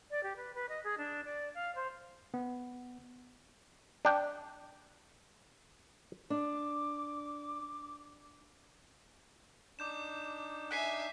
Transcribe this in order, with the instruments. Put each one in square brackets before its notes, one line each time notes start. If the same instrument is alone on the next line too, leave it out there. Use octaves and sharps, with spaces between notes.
[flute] D5
G4
B4
B4
D#5
G#4
D4
D5
F5
C5
[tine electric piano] B3
[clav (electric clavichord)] D4 G5
[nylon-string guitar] D4 [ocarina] D6
[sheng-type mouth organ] D4 D#4 [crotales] D6 G6 E7
[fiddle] E5 G#5 [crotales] F#6 B6 C7